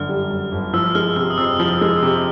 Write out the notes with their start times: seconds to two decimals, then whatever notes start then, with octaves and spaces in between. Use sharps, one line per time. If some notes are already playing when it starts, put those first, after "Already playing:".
Already playing: G1 F#2 D3 F6
0.09 G3
0.30 F#2
0.52 G1
0.73 F3 E6
0.95 G#3 F6
1.16 C3 E6
1.30 D#6
1.38 F2 E6
1.59 F3
1.81 G#3
2.02 C3